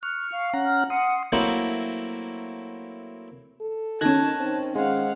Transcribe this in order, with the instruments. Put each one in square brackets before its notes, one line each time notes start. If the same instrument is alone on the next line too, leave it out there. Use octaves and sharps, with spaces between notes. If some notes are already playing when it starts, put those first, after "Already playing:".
[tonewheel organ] C#6 F6 [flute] F#6
[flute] F5
[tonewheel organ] C#4 F#5 A#5
[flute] F6
[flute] F#5 [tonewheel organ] C6 D#6
[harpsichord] F#3 A3 A#3 C4 E4 C5
[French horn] A4
[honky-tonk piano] D#3 C#4 [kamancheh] A5 [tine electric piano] F#6 G#6 A#6
[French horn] C4
[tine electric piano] G#3 [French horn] C4 [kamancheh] F5 F#5